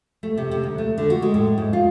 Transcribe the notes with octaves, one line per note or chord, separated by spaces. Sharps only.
A3
C3
C3
D2
A3
D3
F#4
G#3
A2
G#2
F4